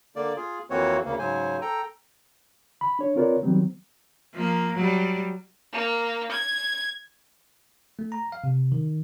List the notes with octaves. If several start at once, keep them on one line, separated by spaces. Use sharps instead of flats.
D3 A#3 D5
F4 G#4
F2 E3 A#3 C4 F#4 C#5
D2 C#3 A#3
G#2 C#3 F#3 C5 G#5
A4 G5 A#5
B5
D4 C#5
C4 F4 A#4 B4 C#5 D5
D#3 F#3 G3 B3 C4
F3 A#3
F#3 G3
A#3
G#6
A3
A#5
F5
C3
D#3